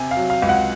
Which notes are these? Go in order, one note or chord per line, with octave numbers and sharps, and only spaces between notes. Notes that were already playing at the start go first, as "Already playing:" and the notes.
Already playing: C3 G#5
F5
F#3
F5
C#2
F#5